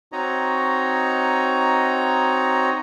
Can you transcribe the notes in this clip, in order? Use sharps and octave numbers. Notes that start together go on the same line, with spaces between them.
C4 D#4 F#4 C#5 D#5 A#5